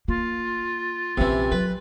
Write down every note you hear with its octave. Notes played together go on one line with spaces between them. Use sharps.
A#3 F4
A#1 C3 E3 C#4
F#3 B4